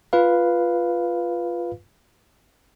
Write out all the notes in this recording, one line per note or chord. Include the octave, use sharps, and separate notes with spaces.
F4 B4 F5